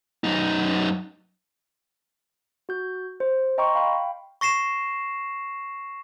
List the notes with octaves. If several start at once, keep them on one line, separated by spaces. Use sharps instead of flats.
F#2 D#4
F#4 G6
C5
D#5 G5 A#5 C6 C#6
F5 G5 B5
C#6 A#6 C7 E7